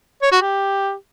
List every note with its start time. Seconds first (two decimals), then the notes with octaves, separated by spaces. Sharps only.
0.22 C#5
0.32 F#4
0.41 G4